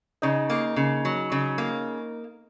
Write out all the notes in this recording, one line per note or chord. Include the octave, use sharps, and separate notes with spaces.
C#3 D#4
A#3
C#3
F#3
C#3
A#3